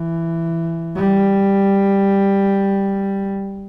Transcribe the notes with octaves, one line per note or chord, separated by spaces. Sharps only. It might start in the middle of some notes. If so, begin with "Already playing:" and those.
Already playing: E3
G3